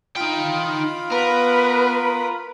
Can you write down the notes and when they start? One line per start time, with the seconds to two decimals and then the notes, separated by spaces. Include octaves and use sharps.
0.16 D#4 F4 F5 G5 B5
1.12 B3 A#4 B4